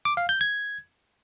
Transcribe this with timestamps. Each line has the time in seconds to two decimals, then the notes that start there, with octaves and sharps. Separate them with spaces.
0.05 D6
0.17 F5
0.29 G6
0.41 G#6